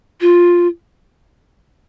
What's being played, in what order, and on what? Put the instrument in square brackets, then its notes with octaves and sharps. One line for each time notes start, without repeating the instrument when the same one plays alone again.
[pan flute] F4